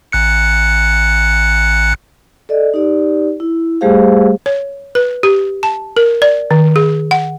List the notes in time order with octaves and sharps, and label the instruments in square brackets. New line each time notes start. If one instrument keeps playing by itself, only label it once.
[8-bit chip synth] A1 F#6 C#7
[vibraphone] A4 D5 D#5
D#4 G4 D5
E4
G3 A3 G4 G#4 C5 F5
[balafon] C#5
B4
G4
A5
A#4
D5
D#3
G#4
F#5